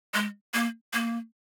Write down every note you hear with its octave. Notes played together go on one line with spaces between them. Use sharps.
G#3
A#3
A#3